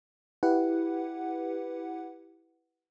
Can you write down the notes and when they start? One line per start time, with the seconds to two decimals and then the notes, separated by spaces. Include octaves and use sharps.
0.43 E4 G4 B4 F#5